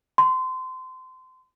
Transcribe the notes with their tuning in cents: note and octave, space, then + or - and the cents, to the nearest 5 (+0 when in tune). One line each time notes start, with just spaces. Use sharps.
C6 -25